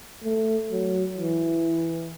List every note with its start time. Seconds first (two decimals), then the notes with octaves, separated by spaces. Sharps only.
0.24 A3
0.71 F#3
1.18 E3